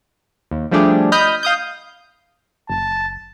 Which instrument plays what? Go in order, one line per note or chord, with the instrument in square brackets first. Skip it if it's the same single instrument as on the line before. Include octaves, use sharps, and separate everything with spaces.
[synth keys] D#2
F3 G3 A3 D4 G4 G#4
D#5 B5 D#6 F6 G6
F5 D#6 G6
[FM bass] F#1 [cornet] A5